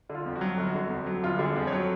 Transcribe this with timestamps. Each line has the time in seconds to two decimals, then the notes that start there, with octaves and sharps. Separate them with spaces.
0.09 D3
0.15 F4
0.26 F2
0.36 F#4
0.41 F#3
0.57 G1 F#4
0.75 D3
0.90 F2
1.06 F#3
1.23 G1 F4
1.38 D3 G4
1.45 G#4
1.56 F2
1.67 F#3 C#5